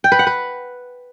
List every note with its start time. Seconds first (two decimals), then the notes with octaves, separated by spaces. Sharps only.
0.04 G5
0.12 B4
0.19 F#5
0.27 B4